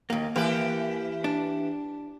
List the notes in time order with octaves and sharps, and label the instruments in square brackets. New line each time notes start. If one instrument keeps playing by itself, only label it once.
[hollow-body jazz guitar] D#2 A#3
[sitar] E3 G4 B4 [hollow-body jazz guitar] A#3
[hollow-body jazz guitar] D4